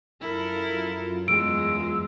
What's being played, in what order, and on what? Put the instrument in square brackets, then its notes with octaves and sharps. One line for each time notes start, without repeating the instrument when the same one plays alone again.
[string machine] F#2 F4 [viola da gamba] E4 A4 A#4
[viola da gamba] E2 G#3 [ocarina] E6 [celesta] D7